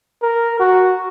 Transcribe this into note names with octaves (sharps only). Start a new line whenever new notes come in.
A#4
F#4